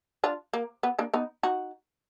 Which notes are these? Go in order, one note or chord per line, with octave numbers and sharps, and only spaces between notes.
D4 F4
A#3
B3
A#3 D4
B3 D#4
D#4 F#4